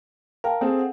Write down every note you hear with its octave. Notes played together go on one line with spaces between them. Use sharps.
A#4 F5 G5 A5
C4 G#4 A4
F#5